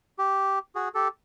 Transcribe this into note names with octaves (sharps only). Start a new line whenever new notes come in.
G4
F#4 G#4
G4 A4